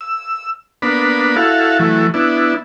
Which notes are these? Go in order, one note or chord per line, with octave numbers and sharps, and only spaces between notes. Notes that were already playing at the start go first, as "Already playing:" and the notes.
E6
A#3 B3 D4 B5
E4 F#4 A4 F5
E3 F#3 A3
B3 D4 E4